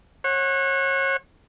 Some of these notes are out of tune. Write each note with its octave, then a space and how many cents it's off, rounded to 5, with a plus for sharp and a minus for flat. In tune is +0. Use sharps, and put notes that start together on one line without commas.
C#5 -35 F#5 +0